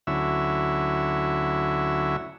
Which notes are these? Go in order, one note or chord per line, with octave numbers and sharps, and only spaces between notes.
D2 F#3 C#4 E4 E5